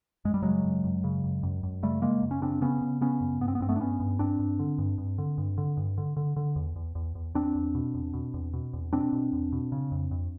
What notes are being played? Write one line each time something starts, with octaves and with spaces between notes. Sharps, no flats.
F#2 G#3
G3
C#3 F#3 G#3
F#2
F#2
C#3
F#2
F#2
F#2
C#3 G3 A3
C#3 G#3 A#3
F#2
C#4
C#3 C4 D4
C#3 B3 C#4
C#3
C#3 B3 C#4
F#2
G2 B3
C4
B3
G2 C4
A3 B3
D4
G2 B3 C#4
G2
G2 C4 D4
G2
D3
G2
G2
D3
G2
D3
G2
D3
D3
D3
E2
E2
E2
E2
E2 C4 D4
E2
B2
E2
B2
E2
B2
E2
B2 C4 D4
B2
E2
B2
C#3
F2
F2